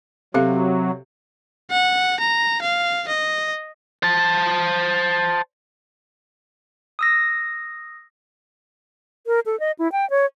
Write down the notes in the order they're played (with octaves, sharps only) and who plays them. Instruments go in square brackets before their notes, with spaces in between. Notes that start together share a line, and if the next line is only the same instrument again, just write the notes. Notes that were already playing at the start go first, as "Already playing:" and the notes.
[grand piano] C3 [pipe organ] F#3 [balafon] G4 A4 F5
[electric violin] F#5
A#5
F5
D#5
[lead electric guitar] C5 A5
[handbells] D#6 E6 A#6
[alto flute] A#4
A4
D#5
E4
G5
C#5